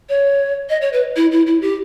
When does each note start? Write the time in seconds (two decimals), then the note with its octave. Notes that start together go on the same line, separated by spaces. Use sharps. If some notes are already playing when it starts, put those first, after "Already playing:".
0.09 C#5
0.70 D#5
0.81 C#5
0.93 B4
1.16 E4
1.32 E4
1.47 E4
1.62 G4